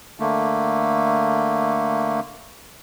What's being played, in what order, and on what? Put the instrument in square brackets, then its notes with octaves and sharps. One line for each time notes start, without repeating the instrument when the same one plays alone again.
[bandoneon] D3 A3 A#3